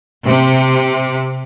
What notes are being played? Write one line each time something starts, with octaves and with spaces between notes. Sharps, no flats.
C3